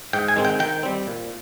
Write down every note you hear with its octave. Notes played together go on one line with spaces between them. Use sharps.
G#2 G5
G#5
D#3 G#3 C4
G5
D#3 G5
G3 C4
A#2